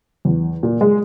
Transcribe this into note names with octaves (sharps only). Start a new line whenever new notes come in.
E2
A#2
G#3